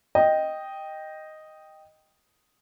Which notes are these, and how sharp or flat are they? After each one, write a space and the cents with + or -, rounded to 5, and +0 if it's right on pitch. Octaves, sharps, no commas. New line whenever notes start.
D#5 +0 G5 +0